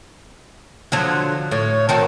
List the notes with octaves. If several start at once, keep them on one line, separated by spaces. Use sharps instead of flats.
D3 F3 F#3
A2 C#5
D#3 C4 F#4 A5